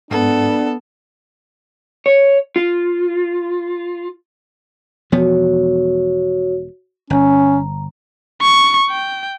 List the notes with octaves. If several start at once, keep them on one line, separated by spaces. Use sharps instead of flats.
G#2 B3 D4 A4
C#5
F4
E1 F3 B3 F#4 C#5
G1 C#4 A#5
C#6
G5